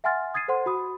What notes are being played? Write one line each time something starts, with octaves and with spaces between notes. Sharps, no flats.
E5 F#5 G#5 C6 F6 A6
D#6 G#6 A6 C7 D#7
A4 C5 F#5 C6
F#4 B5 D#6